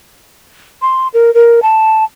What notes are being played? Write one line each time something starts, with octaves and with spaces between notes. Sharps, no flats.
C6
A#4
A#4
A5